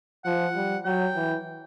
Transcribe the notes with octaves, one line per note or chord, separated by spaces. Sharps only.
F3 F#5
G3
F#3 G5
E3